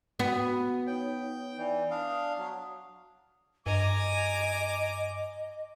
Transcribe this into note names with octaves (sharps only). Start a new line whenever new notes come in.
B3 F#4
D#4 C#5 G5
E3 D5
D4 F5 D#6
F#3
G2 D#5 G#5 A#5 D6